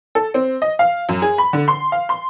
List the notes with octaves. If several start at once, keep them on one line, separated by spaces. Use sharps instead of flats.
A4
C4
D#5
F5
F#2
G#4
B5
D3
C6
F5
C6